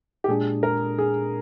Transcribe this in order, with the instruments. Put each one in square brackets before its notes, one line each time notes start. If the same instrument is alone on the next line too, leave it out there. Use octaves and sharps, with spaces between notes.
[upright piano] G4
[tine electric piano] A#2 G#3 D4 [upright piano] G#4
[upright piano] A#4
G#4